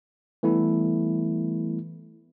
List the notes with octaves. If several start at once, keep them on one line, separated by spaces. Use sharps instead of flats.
E3 G3 A3 B3 E4